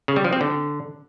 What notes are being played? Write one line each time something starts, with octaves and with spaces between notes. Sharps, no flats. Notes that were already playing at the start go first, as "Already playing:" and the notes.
C#3
G3
F3
C4
D3